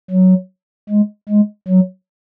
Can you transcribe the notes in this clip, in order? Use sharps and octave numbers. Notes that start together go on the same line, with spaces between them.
F#3
G#3
G#3
F#3